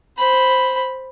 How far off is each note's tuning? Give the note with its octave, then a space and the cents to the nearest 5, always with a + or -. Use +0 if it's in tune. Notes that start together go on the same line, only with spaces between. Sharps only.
C5 +0 B5 +0